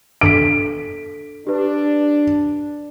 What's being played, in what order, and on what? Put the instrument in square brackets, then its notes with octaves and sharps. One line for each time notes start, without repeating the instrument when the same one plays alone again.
[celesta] D4 A4 B6 [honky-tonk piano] D7
[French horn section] D4 [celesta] G4 B4